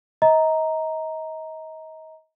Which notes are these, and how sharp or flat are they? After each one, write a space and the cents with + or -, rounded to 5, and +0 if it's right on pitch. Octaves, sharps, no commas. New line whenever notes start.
D#5 +35 A#5 +0